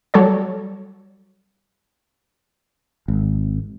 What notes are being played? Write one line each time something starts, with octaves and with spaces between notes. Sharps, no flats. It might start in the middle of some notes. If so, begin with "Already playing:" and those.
F#3 G3 A4 C#5 D5
G#1